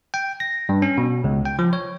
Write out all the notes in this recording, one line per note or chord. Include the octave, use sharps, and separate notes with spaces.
G5
A#6
G2
C#4
B2
C#2
G5
F3
C#5